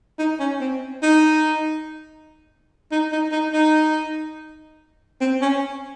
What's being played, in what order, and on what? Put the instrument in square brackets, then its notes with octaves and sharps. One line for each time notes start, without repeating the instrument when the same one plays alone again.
[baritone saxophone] D#4
C#4
C4
D#4
D#4
D#4
D#4
D#4
C4
C#4